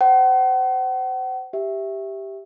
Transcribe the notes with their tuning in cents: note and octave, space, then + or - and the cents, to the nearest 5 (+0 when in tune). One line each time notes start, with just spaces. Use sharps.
C5 -20 F#5 +40
G4 +0 E5 +0